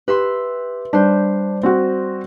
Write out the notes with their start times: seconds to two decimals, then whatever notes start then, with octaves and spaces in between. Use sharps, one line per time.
0.08 G4 B4 E5 C6
0.93 G3 D4 C5
1.63 C4 F#4